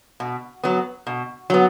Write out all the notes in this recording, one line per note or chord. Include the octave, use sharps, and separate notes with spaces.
B2
F#3 B3
B2
F#3 B3